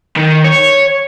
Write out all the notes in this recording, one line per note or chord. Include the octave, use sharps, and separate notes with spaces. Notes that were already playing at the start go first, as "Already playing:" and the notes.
D#3
C#5